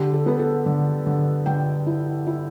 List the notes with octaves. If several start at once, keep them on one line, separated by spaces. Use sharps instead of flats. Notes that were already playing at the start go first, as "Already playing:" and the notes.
Already playing: D3 G4
A4
B3 B4
A4
D3
D3
D3 G5
E4
E4